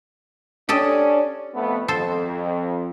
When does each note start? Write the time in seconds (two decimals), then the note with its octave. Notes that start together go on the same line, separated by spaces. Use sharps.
0.69 C#4 D4 G4 A4 D#5
1.55 F2 A3 B3
1.88 F2 A4 C5